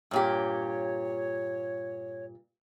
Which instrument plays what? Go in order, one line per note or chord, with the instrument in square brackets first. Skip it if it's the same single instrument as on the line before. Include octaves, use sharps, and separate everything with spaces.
[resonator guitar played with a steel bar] G2 A#2 G4 [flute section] C#5